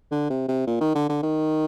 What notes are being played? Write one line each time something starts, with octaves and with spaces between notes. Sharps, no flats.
D3
C3
C3
A#2
D#3
D3
D3
D#3